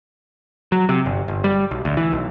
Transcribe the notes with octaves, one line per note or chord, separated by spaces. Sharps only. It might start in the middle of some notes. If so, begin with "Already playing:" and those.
F#3
C3
G1
G1
G3
B1
D2
E3
B1